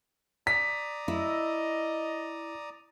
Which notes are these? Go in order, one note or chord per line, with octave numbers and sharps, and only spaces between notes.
D5 A#5 D#6 B6
E4 D#5